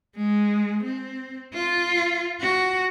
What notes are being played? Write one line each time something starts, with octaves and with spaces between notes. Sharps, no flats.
G#3
C4
F4
F#4